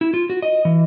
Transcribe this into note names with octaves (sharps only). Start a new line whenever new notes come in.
E4
F4
F#4
D#5
E3